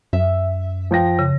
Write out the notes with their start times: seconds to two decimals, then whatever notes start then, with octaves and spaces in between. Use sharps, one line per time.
0.13 F#2 E5
0.91 F3 G5 A#6
1.19 C#3